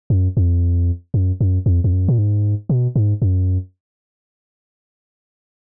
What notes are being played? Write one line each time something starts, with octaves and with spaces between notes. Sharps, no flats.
F#2
F2
F#2
F#2
F2
F2
F#2
A#2
G#2
B2
G#2
F#2